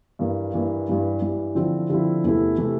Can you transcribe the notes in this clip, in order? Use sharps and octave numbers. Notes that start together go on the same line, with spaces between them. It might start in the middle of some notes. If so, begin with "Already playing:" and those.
G2 E3 A#3
G2 E3 A#3
G2 E3 G3
G2 E3 G3
D3 F3 C4 E4
D3 F3 C4 E4
E2 C3 E3 A3 E4
C3 E3 A3 E4